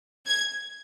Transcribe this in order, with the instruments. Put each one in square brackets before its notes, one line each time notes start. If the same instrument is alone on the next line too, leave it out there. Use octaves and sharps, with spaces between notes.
[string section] G#6